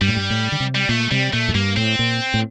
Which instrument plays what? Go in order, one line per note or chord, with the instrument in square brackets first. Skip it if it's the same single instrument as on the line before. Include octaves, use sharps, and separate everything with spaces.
[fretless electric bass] G2 [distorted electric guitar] G3
[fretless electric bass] A2
G2
A2
D3
C3
[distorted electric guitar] G3
[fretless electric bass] A#2 [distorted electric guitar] A3
[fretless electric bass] C3 [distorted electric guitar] G3
[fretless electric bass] A#2 [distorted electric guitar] A3
[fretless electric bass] F2
[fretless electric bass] G2 [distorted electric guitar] A#3
[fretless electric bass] A2 [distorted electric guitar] C4
[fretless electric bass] A#2
A2